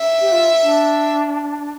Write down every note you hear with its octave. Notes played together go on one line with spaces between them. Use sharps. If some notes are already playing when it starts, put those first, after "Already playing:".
Already playing: E5
G4
F4
D4